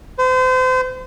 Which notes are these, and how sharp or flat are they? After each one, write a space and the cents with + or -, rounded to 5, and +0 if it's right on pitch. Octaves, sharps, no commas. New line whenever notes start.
C5 -35